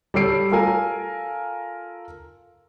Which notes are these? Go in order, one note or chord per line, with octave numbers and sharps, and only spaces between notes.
G3 A4 C#5 E6 C7 D7
F4 A4 A#4 G#5